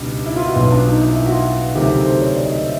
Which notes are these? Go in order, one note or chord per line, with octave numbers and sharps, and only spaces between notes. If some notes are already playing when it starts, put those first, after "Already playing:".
Already playing: C#2 B2 G3 D4 D#4
E4
F4
F#4
B1 B2 F#3 F4
D4
D#4
E4
E4
F#4
F4
D2 C3 D#3 F#3 G4
A4
C5
C#5
D5
D#5
E5